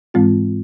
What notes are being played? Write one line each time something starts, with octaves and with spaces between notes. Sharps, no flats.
G#2 E3 G#3 C4 F4